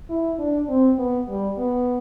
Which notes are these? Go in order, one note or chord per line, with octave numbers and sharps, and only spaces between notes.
E4
D4
C4
B3
G3
B3